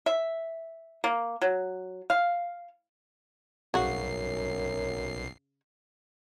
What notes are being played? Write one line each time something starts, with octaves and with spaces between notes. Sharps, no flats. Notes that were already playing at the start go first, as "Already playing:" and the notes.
E5
A#3
F#3
F5
B1 F#2 C#3 F#4 C7